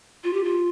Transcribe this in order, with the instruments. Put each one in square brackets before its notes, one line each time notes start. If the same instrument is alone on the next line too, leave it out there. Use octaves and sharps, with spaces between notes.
[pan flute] F4
G4
F4